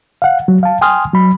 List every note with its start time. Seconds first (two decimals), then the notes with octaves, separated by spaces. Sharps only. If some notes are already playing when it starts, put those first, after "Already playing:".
0.22 F5 F#5
0.48 F#3
0.63 F5 A5
0.81 G5 G#5 C6 D#6 F6
1.14 F#3 B5